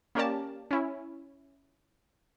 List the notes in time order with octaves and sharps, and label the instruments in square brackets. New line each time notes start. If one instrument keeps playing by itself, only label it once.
[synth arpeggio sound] A#3 C#4 G4 A#4 D5 A5
C#4 E4